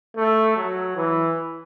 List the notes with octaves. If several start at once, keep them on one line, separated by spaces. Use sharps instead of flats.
A3
F#3
E3